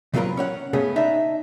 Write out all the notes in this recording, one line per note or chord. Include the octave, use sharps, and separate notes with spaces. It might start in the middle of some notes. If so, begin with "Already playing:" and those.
C#3 F#3 C4 F4 A#4 B4
C#4 C#5 F#5
C#3 A3 B3 C#4 G#4
D4 D#4 E5